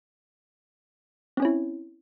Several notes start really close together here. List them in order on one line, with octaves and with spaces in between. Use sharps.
C4 C#4 C#5 E4